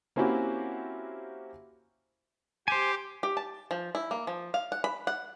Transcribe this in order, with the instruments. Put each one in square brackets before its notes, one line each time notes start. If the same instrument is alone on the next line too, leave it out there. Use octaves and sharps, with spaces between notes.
[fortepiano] A#3 C4 C#4 E4 F#4 G4
[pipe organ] G4 [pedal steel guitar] C5 G#5
[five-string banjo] G4
A5
F3
E4
A#3
F3
F5
F#5
B5
F#5